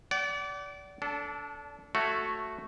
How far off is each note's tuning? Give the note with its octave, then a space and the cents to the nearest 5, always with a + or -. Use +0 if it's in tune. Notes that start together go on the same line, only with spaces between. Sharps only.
D5 -25 F#5 +40
D4 -30 A4 +0
A3 +0 F#4 +0 C#5 +0